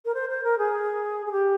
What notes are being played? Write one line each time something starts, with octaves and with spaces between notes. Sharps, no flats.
A#4
C5
C5
A#4
G#4
G#4
G4